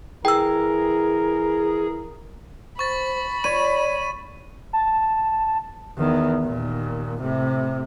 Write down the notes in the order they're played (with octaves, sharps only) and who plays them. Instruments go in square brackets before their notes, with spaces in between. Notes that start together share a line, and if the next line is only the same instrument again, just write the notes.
[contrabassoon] E3 [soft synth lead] G#4 [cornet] A#4 [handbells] G5 E6
[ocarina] C5 [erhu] B5 [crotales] C#6 A6
[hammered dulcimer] C#5 [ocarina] D5 [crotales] D#7
[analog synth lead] A5
[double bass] E2 D#3
D#2 A#2
A2 C3